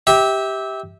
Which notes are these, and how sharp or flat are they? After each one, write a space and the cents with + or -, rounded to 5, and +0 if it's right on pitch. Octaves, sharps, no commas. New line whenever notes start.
G4 +0 E5 -25